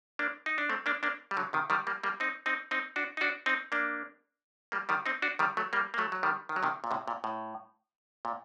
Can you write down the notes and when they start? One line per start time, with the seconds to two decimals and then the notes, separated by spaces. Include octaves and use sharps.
0.19 A#3 D4
0.46 D#4
0.58 D4
0.69 A3 C4
0.86 A#3 D4
1.03 A#3 D4
1.31 G3
1.37 D3 F#3
1.53 C3 D#3
1.70 D#3 G3
1.87 G3 A#3
2.03 G3 A#3
2.20 C4 D#4
2.46 C4 D#4
2.71 C4 D#4
2.96 D4 F#4
3.17 D#4
3.21 D4 F#4
3.46 C4 D#4
3.72 A#3 D4
4.72 G3 A#3
4.89 D#3 G3
5.06 C4 D#4
5.22 D4 F#4
5.39 D#3 G3
5.57 F#3 A3
5.73 G3 A#3
5.94 A#3
5.98 F#3 A3
6.12 F#3
6.23 D#3 G3
6.49 D#3
6.56 F#3
6.63 C3 D#3
6.84 A#2
6.91 A2 C3
7.08 A#2
7.24 A2
8.25 A#2